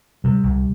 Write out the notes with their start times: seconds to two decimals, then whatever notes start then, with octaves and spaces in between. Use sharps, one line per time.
0.24 C3 G3
0.43 C2